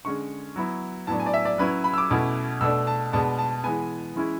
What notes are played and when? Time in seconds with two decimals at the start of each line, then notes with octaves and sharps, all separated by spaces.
0.05 D3 G#3 C#4 C#6
0.56 F#3 B3 E4
1.07 A2 F#3 B3 D4 A5
1.20 G#5
1.26 D5
1.34 E5
1.45 D5
1.58 F#3 C#4 E4 B4
1.84 B5
1.94 E6
1.98 D6
2.10 B2 A3 C#4 E4
2.61 B2 A3 D4 E6
2.87 A5
3.12 B2 G#3 B3 D4 A5
3.38 A5
3.63 E3 G#3 B3 G#5
4.15 E3 G#3 C#4 E4